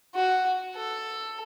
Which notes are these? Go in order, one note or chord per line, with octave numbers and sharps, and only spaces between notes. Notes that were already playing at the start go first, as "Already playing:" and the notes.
F#4
A4